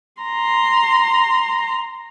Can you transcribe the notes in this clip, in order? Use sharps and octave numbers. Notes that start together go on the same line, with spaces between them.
A#5 C6